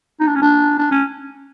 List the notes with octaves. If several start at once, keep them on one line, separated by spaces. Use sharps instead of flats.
D#4
D4
C#4
D4
D4
C#4